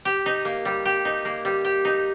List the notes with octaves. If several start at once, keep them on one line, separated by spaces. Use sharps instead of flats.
G4
D#4
A#3
G3
G4
D#4
A#3
G3
G4
D#4